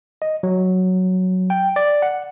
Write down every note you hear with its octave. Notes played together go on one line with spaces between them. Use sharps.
D#5
F#3
G5
D5
F#5